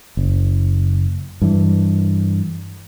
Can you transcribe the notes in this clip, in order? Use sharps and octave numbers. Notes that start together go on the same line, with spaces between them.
F#1
G2 E3